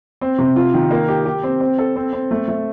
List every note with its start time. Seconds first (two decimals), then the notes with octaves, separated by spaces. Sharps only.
0.21 C4
0.38 C3
0.56 F4
0.74 D#3
0.91 A#3
1.08 G4
1.25 G4
1.43 C4
1.60 C4
1.78 A4
1.96 C4
2.13 C4
2.31 A3
2.48 A3